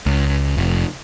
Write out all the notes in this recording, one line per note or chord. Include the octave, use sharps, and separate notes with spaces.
C#2
F1